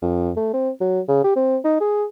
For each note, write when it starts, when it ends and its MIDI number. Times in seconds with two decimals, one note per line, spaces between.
0.02 0.31 41
0.37 0.49 57
0.54 0.70 60
0.80 1.00 54
1.08 1.21 49
1.24 1.33 67
1.36 1.57 60
1.64 1.77 63
1.81 2.05 68